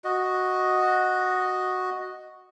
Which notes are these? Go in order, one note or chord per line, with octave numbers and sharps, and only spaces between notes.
F#4 D#5